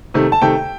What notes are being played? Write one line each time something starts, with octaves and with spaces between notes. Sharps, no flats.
C3 D#3 A3
A5
C3 D#3 A3 G5